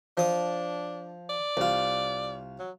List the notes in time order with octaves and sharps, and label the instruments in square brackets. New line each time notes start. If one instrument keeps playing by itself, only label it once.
[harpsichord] F3 D#6 [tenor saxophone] D4
[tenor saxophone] D5
[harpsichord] C2 F4
[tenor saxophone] F#3